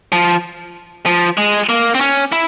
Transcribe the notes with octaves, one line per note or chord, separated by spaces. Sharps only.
F3
F3
G#3
A#3
C4
C#4
E4